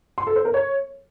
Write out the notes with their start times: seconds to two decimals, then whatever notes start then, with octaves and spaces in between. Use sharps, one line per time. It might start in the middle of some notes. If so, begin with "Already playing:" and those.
0.18 C6
0.27 A4
0.36 C5
0.45 A#4
0.54 C#5